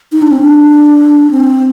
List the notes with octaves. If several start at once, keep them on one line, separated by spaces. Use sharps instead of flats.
D#4
D4
C4
D4
C4